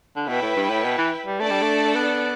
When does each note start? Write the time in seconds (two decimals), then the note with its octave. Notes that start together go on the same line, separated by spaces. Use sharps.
0.16 D3
0.28 B2 E4 B4 G5
0.42 A2
0.56 G2
0.70 A2
0.84 B2
0.98 E3
1.26 G3
1.40 A3 D4 A4 D5
1.51 G3
1.62 A3
1.95 B3